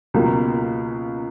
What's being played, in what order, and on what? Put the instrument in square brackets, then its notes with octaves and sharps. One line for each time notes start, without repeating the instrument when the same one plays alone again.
[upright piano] C#2 B2 F#3 A#3